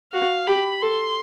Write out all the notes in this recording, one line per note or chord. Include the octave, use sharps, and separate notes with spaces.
F#4 F5
G4 B5
A4 C6